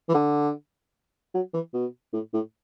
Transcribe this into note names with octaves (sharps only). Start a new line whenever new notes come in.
E3
D3
F#3
E3
B2
A2
A2